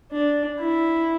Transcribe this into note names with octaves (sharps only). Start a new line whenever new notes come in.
D4
E4